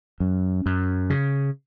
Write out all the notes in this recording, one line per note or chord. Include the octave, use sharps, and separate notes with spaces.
F#2
F#2
C#3